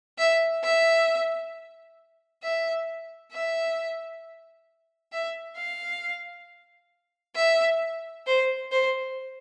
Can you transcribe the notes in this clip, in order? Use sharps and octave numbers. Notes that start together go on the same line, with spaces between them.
E5
E5
E5
E5
E5
F5
E5
C5
C5